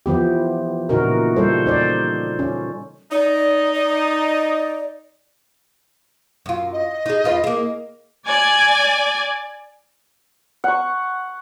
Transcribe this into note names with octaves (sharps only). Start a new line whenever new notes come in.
E3 F3 B3 G4
A#2 C#3 E3 D#4 F#4 A#4
G3 A4 C5
D#4 C5 D5
C#4
D#4 D5
D5
F#2 F4
D#5
D#4 G#4
E2 F4 B4
A#3 G#4
D5 G#5
F#5 C#6